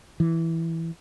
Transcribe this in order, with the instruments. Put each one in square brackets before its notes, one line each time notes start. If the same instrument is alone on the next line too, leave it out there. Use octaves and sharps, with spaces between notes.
[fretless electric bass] E3